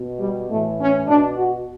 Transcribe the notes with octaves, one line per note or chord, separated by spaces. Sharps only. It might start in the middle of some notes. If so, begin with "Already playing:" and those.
Already playing: B2
G3
A2 E3 A3
C#4
B2 D4
F#4